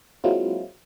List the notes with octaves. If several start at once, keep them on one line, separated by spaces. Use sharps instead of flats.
F#3 G#3 A#3 C4 E4 F4